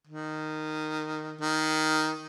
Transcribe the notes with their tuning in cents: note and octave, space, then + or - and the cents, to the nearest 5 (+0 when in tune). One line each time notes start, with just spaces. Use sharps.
D#3 -10
D#3 +5